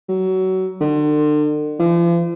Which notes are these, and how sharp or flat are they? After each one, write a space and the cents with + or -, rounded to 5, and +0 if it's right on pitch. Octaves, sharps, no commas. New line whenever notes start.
F#3 +25
D3 +40
F3 -40